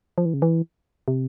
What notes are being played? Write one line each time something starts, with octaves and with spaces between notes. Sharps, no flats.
F3
E3
C#3
E3
C3